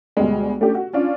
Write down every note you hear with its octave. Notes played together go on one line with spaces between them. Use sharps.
D2 B2 G3 G#3
A3 C#4 D4 G4
F#4
C#4 D4 F4